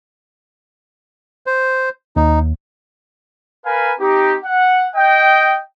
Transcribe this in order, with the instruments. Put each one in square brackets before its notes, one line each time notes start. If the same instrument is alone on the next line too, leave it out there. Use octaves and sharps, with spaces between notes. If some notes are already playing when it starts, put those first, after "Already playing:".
[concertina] C5
[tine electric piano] D#2 [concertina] D#4
[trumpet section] A#4 B4 F5 G#5 B5
C4 D#4 G4
F#5
D#5 G5